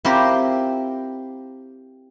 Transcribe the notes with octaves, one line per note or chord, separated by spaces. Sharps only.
C4 E4 F4 G4 A#4 C5